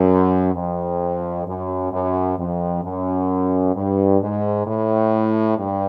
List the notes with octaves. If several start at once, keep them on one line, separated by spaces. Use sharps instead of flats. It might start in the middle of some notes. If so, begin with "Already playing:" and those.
Already playing: F#2
F2
F#2
F#2
F2
F#2
G2
G#2
A2
G2